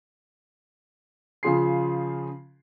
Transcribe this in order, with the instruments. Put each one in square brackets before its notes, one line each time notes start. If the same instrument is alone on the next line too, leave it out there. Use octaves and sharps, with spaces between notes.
[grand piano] C#3 F3 F4 G#4 C6 C7